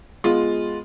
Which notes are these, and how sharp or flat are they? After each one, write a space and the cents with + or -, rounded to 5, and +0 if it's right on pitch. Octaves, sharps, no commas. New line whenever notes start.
G#3 +0 B3 +0 F4 +0